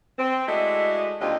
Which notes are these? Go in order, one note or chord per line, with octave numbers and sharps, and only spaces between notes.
C4
G#3 A3 D4 E4 F#4 D#5
D#2 D3 G3 C4 F4 D#5